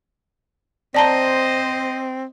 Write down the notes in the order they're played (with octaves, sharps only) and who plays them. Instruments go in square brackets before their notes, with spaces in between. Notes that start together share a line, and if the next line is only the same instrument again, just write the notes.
[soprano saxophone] C4 [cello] C5 D#5 [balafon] D5 A5 A#5